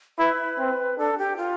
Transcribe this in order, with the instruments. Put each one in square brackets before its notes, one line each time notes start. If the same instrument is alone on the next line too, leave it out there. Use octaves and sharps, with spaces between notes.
[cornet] E4 [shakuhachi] B4
[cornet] C4
[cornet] D4 [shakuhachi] A4
[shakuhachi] G4
F4